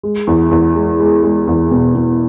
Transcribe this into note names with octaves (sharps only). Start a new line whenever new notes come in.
G#3
E2
E2
G#3
G#3
G#3
E2
B2
B2